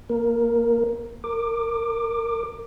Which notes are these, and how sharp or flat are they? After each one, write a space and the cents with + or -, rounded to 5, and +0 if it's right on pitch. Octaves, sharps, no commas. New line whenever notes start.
A#3 +0 A#4 +5
A#4 -20 D6 +20